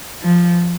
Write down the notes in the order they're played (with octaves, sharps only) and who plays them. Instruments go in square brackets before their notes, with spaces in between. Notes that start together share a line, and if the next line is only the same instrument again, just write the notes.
[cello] F3